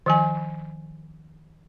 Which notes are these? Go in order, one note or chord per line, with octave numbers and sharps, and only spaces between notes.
D#3 F3 G#5